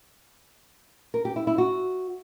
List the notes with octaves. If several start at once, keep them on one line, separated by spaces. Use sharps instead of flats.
A#4
G4
E4
E4
F#4